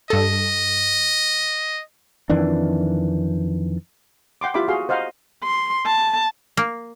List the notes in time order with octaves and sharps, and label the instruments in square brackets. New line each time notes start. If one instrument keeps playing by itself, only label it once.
[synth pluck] G2 A4 [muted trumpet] D#5
[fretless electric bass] F2 D#3 E3 D4
[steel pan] F#5 G5 C6 D6
E4 F4 G4 E5 B5 D6
F#4 G#4 F5 C6
C5 D#5 F5 F#5 A#5 C6
[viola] C6
A5
[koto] A#3